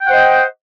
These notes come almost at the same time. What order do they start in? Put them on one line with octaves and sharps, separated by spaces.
G5 F#5 C5 D#5